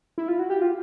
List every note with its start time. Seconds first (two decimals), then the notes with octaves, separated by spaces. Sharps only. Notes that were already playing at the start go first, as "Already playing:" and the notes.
0.18 E4
0.28 F4
0.39 F#4
0.50 G4
0.62 F4